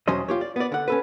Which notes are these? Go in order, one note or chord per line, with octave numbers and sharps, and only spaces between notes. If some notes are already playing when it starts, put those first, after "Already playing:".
E2 B2 F#3 C#4 C5 D#5
F4 G4 C#5
D5
B3 D5
D3 F#5
C#4 A4 B4